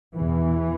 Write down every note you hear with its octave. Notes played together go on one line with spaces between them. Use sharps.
E2 B2 E3